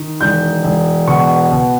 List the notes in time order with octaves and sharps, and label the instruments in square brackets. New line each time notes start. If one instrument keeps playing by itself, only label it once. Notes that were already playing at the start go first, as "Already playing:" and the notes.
Already playing: [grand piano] D#3
E1 G6
E1
B2 C#6
B2